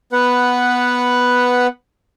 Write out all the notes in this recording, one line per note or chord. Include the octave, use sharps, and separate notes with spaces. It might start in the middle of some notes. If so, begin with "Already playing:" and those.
B3 B4 F#5